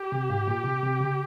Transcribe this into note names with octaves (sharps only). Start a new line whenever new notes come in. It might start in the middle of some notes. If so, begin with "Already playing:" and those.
Already playing: G4
C3
G#2
A#2
C3
C3
C#3